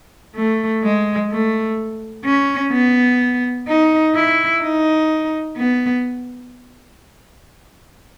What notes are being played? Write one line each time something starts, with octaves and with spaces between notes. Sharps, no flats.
A3
G#3
A3
C#4
B3
D#4
E4
D#4
B3